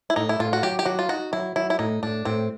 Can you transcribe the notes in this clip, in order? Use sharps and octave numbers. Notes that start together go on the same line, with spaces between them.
E4
A2 D#4
E4
A2 F4
F#4
F#3 G4
G4
F#3 F#4
F4
D#4 F#4
F#3 E4
F#3 E4
E4
A2 D#4
A2 D4
A2 C4